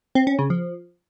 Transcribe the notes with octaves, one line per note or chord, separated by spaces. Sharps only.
C4
C#4
C#3
F3